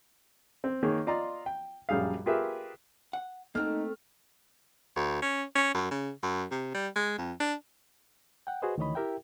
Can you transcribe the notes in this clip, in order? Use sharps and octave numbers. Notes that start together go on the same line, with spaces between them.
C4
D#3 A#3 G#4 C#5
F4 D5 D#5 A#5 C6
G5
A#1 F#2 G3 G#4 F5
F4 G4 G#4 A#4 B4 E5
F#5
A3 A#3 C4 D#4 F#4 F6
D2
C#4
C#4
F#2
C#3
F#2
C3
G3
G#3
F2
D4
F#5 G5
F#4 G#4 B4 C5 D#5
D2 D#3 E3 C#5 D#5 B5
E4 G4 A#4 E5 G5